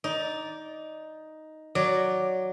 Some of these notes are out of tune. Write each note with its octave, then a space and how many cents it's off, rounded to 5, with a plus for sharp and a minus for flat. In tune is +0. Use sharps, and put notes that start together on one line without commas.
D#4 +5 D5 -10
F#3 +0 D5 +0